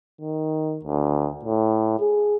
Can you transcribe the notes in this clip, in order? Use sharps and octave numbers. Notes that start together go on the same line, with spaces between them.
D#3
D2
A2
G#4